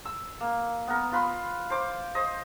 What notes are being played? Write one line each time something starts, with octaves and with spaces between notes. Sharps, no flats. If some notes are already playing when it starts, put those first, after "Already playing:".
E6
A#3
B3 A#4
F4 B4 B5 C6
C5 D6
C5 D#5